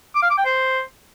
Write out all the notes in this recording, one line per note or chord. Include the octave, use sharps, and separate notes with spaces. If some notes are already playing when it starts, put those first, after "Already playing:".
D6
F5
D6
G5
C5